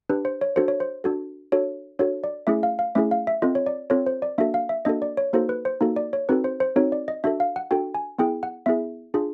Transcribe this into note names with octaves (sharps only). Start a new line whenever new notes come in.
D4 G4 B4
C5
C#5
D4 F#4 A4 C5
C#5
C5
D4 F#4 A4
D4 F#4 A4 C#5
D4 F#4 A4 C#5
D5
A3 C#4 E4 G#4 E5
F5
F5
A3 C#4 E4 G#4 E5
F5
E5
C4 F4 A4 D#5
C#5
D5
C4 F4 A4 C#5
C5
D5
A#3 D4 F#4 A4 E5
F5
E5
A#3 D4 F#4 A4 D#5
D5
C#5
A#3 D#4 F#4 A4 C5
B4
C5
A#3 D#4 F#4 A4
D5
C#5
C4 D#4 F#4 A4 B4
C5
C5
C4 D#4 F#4 A4 C#5
D5
D#5
D4 F#4 A4 E5
F5
F#5
D4 F#4 A4 G5
G#5
B3 E4 G#4 G5
F#5
B3 E4 G#4 E5
D4 F4 G#4